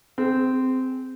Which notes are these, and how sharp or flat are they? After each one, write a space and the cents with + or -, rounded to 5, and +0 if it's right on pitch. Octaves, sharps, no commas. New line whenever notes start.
C4 -15 G#4 +0